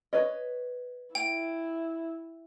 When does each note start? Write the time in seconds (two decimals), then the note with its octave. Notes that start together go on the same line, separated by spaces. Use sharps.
0.13 B4 C#5 D#5
1.15 E4 G5